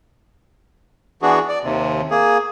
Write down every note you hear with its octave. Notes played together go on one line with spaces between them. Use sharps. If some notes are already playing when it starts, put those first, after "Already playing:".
E3 B3 D4 F#4 G#4
D5
D#2 C3
A#3 G#4